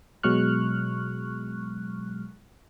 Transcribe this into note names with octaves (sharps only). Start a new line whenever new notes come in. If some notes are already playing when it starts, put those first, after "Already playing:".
B2 F#3 G#3 C#6 F6 F#6